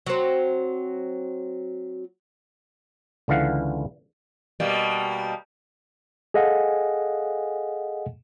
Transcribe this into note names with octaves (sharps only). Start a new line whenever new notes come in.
F#3 C4
C#2 D3 E3 F5 F#5
B2 G3 A#3
G#4 A4 D#5 F5 F#5 G#5